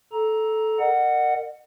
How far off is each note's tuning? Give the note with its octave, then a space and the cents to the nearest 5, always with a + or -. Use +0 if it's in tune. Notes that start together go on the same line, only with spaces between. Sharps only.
A4 -10 A#5 +10
A#4 -25 D#5 -45 F#5 +0